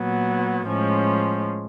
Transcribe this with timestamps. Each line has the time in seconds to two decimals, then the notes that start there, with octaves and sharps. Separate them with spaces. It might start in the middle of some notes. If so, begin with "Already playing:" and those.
Already playing: A#2 F#3 B3
0.66 A2 F3 G#3 C#4